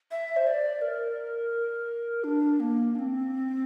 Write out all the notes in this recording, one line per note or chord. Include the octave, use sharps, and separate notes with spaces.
E5
C5
D5
A#4
D4
A#3
D4
C4